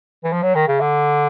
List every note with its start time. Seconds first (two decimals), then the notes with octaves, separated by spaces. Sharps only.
0.24 E3
0.33 F3
0.42 F#3
0.55 D#3
0.68 C#3
0.80 D3